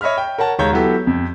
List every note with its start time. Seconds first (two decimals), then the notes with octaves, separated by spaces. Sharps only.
0.01 C#5 D#5 E5 B5 F6
0.18 G5
0.38 A#4 C#5 F#5 A5
0.59 D#2 G#3 C#5 A#5 G6
0.73 F#3 B3 E4 G4 A4
1.07 F2